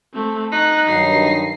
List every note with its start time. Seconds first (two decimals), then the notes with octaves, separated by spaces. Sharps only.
0.14 A3 C4
0.52 D#4 F#6
0.89 G2 D#3 F#3 C7